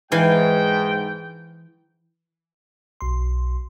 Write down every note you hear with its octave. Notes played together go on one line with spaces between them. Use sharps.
G#2 E3 F5 G5 G#5
B1 C6